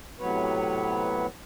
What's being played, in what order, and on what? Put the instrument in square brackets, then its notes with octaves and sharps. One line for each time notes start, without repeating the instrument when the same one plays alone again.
[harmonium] A2 C3 F#3 B3 B4 C#5